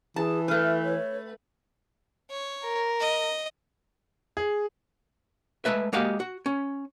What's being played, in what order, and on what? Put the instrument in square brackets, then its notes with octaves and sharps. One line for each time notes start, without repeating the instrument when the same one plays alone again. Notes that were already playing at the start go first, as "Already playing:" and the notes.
[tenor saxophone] E3 [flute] G#4 [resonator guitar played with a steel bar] A5
[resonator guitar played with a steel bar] A3 B4 [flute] F6
[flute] C#5
[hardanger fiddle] C#5
[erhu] A#4
[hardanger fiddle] D#5
[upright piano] G#4
[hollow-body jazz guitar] G#3 A3 B4 E5
G#3 A#3 F#4 G4 D#5 F5
F#4
C#4